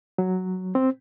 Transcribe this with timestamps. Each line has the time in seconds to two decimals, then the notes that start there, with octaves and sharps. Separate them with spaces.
0.18 F#3
0.75 C4